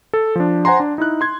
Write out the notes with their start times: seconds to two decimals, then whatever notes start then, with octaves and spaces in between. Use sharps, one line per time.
0.13 A4
0.36 F3 D4
0.65 C5 F#5 G#5 A#5 C6
0.80 D4
0.98 D#4 E4 F#6
1.21 C6 G#6